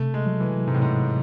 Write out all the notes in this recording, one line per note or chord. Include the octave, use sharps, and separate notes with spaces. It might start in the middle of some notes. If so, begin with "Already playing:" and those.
Already playing: C3 A3
G#3
F#3
E3
G#2 C3
A2
G#2